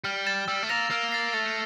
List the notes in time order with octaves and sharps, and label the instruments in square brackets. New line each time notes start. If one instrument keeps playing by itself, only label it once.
[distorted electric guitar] G3 [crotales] F6
[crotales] A6 E7
[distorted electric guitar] G3 [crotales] E6
[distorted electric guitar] A3
[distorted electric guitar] A#3 [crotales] A#6 F7
[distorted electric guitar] A#3 [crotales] F6
[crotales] A6 C7
[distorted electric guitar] A3 [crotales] A6